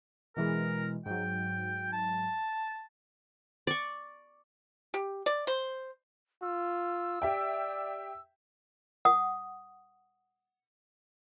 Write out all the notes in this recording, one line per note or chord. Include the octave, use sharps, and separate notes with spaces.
B2 E3 G#3 A#4
G#2 F#3 G5
A5
D5 C#6
G4
D5
C5
F4 E6
G4 D5 E5 G5
F#5 D#6